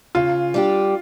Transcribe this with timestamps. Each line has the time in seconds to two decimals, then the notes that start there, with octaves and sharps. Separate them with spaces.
0.15 C#3 F4
0.54 G3 D4 G4